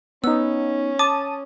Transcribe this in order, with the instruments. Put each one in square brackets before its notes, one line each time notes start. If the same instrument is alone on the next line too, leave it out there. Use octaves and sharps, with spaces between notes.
[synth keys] B3 D#4 [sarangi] C#4 [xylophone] E6
[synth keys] A5 D#6 D#7 [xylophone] D6